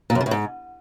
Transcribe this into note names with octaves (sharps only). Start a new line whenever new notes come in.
A#2
F#2
C#3
A2
G#2